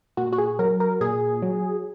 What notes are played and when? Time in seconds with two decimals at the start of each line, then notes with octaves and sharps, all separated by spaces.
0.17 A#2 F#4
0.32 F#4
0.38 G#4
0.59 F#3 A#4
0.80 A#4
1.01 A#2 G#4
1.42 F#3